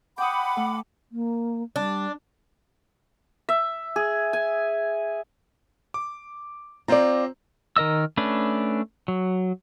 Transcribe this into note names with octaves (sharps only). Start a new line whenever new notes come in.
F#5 G5 B5 D6 D#6
A3
A#3
G3 D4
E5
G#4
G#5
D6
C4 F4 C5 D5 A#5
D#3 A#4 D#5 E6
A3 C#4 D4 B4
F#3